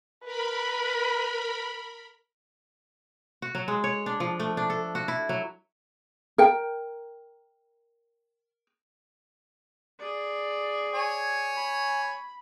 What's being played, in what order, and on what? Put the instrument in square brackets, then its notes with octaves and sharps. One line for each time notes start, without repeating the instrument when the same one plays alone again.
[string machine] A#4 B5 [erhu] B4
[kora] F#4
F#3
G#3
C#5
D4
F3
A3
D4
A4
F#4
E4
F#3
[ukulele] A#4 G5
[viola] G#4 D5
[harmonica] C#5 G#5
[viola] B5